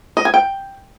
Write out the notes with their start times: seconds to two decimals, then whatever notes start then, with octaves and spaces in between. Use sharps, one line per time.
0.17 D#5
0.25 G#5
0.34 G5